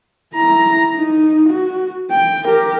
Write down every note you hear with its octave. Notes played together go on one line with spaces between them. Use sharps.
E4 A#5
D#4
F#4
G5
G4 A#4